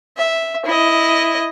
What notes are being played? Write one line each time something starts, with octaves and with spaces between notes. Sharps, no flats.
E5
E4 D#5